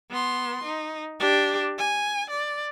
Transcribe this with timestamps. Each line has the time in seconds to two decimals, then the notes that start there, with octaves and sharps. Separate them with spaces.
0.10 B3 C6
0.64 D#4
1.20 D4 G4
1.78 G#5
2.30 D5